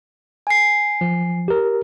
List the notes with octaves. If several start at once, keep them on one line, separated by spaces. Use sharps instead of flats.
G#5 C7
F3
G4 A#4